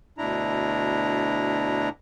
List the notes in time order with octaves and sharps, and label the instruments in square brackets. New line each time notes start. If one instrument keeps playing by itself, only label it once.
[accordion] D2 B2 D4 E4 A#5